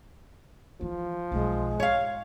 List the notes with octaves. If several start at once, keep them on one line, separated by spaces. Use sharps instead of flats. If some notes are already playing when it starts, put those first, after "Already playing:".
E3 F3 G#3
B1 F#3 G#3
G#2 C#5 F5